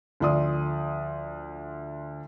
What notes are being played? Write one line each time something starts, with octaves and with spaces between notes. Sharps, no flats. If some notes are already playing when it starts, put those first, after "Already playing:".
D2 F3 D5 C6 D#6